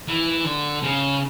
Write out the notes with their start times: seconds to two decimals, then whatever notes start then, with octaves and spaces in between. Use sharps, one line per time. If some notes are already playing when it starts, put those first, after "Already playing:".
0.08 E3
0.44 D3
0.83 C#3